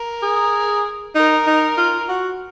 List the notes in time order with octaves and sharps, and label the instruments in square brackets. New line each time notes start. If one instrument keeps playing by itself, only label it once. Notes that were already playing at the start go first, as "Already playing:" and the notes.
Already playing: [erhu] A#4
[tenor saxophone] G#4
[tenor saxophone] D#4 [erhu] A#4
[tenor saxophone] D#4
F4
F#4